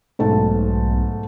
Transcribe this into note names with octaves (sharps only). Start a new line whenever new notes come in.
B1 G#2 A3 A5